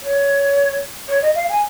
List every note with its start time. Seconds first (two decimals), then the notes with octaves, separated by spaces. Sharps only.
0.02 C#5
1.08 C#5
1.21 D#5
1.35 F5
1.48 G#5